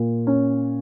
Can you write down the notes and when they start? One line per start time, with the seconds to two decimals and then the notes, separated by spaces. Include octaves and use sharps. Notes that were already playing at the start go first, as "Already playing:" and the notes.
Already playing: A#2
0.27 C#4